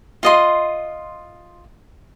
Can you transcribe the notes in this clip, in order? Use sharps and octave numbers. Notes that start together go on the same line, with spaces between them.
F4 D#5 C6